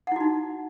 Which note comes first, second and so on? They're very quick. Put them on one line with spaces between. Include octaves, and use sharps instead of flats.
F#5 E4 F#4 D#4